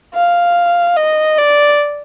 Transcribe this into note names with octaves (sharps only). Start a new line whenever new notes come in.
F5
D#5
D5